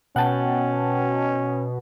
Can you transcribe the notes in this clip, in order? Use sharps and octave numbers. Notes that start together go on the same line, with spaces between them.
B2 C#4 F#5 G5 A5